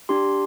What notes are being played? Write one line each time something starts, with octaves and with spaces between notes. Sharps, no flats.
D4 G4 C6